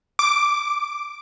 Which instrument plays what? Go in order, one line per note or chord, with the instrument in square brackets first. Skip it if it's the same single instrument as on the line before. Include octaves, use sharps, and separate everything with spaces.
[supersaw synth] D6